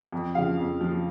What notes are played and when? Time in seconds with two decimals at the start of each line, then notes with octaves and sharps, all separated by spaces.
0.12 F2
0.35 C#3 F3 F5
0.58 F2
0.81 C#3 F3